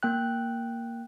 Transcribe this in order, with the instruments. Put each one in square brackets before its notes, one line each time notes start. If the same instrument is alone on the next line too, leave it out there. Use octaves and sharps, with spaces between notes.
[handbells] A#3 G5 F#6